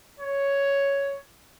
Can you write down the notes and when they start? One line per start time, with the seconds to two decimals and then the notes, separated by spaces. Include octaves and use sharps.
0.19 C#5